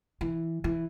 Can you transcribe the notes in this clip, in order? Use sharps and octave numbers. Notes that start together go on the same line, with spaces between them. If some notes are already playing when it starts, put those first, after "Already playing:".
E3
E3